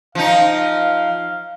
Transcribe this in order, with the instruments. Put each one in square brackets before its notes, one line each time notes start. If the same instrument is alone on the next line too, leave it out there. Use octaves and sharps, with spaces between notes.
[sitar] F3 D#4 [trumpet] F5